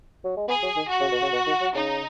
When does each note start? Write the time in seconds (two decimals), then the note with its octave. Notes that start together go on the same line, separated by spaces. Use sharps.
0.24 F#3
0.37 G#3
0.48 B3 G#4
0.63 F#3
0.76 D#3
0.90 F#4
1.01 C#3
1.12 B2
1.22 C#3
1.33 B2
1.47 D#3
1.61 F#3
1.75 C#3 D#4